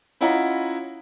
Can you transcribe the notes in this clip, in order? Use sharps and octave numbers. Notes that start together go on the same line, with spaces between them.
C#4 E4 F4 D#5 F#5 A#5